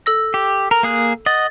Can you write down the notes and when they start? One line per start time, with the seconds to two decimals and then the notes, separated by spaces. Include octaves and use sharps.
0.06 A4 E6 A#6
0.34 G4
0.71 A#4
0.83 A#3 G#4 F#6
1.26 D#5 F#5 A6